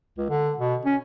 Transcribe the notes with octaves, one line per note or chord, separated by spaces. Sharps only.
C#2
D3
B2
C#4